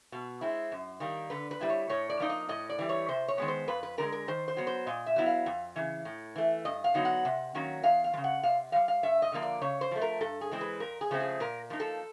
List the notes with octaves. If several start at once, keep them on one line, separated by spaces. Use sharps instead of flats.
B2
G#3 C4 E4
F#2
D#3 G3 A#3
D3 B4
B4
G3 C4 E4
C#5
A2 C#5
D5
F3 A#3 D#4
D#5
A2 D#5
D5
E3 G3
C#5
C3 C5
C#5
D#3 G#3 B3
C5
F2 B4
B4
D3 F3 G#3 A#4
A#4
D#3 C5
C5
F#3 B3
C5
A#2 D#5
E5
F#3 B3 E4
F5
F2
C#3 E3
A2
E3 A3
G2 D#5
F5
D3 F#3 B3 D#4
F#5
C3
D#3 F#3 A#3 C#4
E2 F5
F5
F3
C#3
F#5
C3 F5
E3 G3 F5
F5
G2 E5
D#5
D3 F3 A#3
D5
C#3 C#5
C5
F3 A3
A#4
G2 A4
G#4
E3 G#3 C4
B4
F2 A#4
G#4
C#3 F3 A3 C4
G#4
A#2 A#4
F3 A#3 D#4
A4